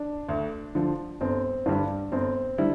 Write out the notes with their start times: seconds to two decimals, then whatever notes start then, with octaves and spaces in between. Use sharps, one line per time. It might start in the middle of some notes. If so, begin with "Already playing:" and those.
Already playing: D4
0.29 D2
0.75 D3 F3
1.21 G1 C4
1.66 G2 D3 G3 D4
2.12 G1 C4
2.58 D3 G3 E4